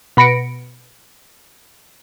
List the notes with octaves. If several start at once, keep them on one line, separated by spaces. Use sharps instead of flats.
B2 B5 A#6 C#7 D7